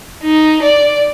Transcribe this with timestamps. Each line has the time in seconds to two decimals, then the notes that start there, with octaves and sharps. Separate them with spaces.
0.24 D#4
0.63 D5